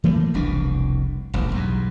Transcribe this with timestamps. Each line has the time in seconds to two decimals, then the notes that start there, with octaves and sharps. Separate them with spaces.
0.04 E3 A3 A#3
0.34 F1 C2 B2 D4
1.34 E1 A1 D#2
1.52 B1 E2 G2